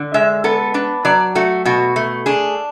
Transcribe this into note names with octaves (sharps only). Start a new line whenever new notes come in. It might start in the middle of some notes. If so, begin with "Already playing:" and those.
Already playing: D3
G#3 E5
B3 A4
D4 B4
F#3 D5
A3 F#4
B2 F#4
A3
D4 G#4